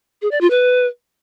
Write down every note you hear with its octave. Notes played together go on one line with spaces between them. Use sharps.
G#4
D5
F4
B4